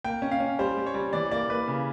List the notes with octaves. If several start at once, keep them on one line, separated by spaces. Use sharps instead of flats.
A#3 G5
C#4
F5
C#4
G3 C5
G3
C#5
G3
E3 D5
A#3 D5
A#3 B4
C#3